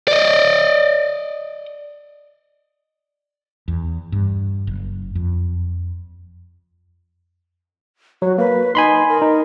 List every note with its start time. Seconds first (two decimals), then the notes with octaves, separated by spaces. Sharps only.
0.08 D5 D#5
3.68 E2
4.12 G2
4.67 F#1
5.15 F2
8.22 F#3 F#4
8.38 A#3 B4
8.75 D#4 G#5 B5 C6
9.09 A#4
9.22 D#4